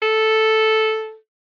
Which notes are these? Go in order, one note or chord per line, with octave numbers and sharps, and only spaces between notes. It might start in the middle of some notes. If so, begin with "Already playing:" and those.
A4